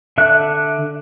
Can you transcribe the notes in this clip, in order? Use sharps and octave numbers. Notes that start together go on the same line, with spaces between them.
D3 E5 F#6